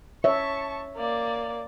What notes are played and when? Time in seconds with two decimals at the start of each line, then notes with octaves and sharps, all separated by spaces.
0.24 C#5 E5 A5 C#6
0.96 A#3 D5